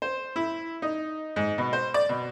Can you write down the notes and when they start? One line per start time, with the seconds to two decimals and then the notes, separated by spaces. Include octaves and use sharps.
0.02 C5
0.36 E4
0.82 D#4
1.36 G#2
1.58 B2
1.73 C5
1.94 D5
2.09 B2